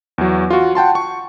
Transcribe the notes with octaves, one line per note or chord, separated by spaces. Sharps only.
E2 F#3
F4 F#4
F#5 G5 A5 C6
C#6